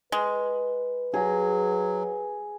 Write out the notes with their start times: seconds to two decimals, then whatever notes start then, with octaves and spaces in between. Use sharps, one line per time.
0.12 G#3 B4
1.14 F#3 G#4 A#5